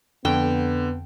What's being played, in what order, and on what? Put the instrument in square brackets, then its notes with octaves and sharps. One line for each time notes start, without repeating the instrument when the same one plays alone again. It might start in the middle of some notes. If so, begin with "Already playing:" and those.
[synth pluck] F2 [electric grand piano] D3 [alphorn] B3 [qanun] G5